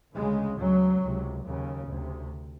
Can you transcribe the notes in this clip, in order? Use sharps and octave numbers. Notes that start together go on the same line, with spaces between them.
D2 C#3 G#3
D2 C#3 F#3
C#2 C3
D#2 C#3
D2 C3